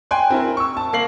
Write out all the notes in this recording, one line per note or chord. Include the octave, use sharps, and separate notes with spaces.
G5 G#5 C6 F#6
C4 E4 A#4
C#6 E6
A5
A#3 C7 F#7